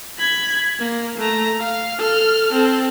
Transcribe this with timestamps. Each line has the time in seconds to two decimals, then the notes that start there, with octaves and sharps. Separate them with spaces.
0.19 B5 G#6
0.79 A#3
1.18 A3 A#5
1.59 F5
1.99 A4 F6
2.53 C4 A4